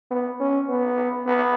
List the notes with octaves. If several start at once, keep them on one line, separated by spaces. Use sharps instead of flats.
B3
C#4
B3
B3